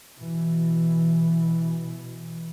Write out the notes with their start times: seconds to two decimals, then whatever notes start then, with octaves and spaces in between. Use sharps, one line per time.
0.19 B2 E3